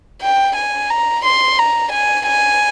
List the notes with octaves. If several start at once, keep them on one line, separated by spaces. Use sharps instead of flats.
G5
G#5
A#5
C6
A#5
G#5
G#5